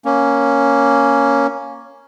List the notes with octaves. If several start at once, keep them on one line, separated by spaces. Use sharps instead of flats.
A#3 C#4